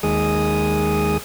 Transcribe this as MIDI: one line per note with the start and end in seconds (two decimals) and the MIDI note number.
0.03 1.17 39
0.03 1.17 56
0.03 1.17 68
0.03 1.17 87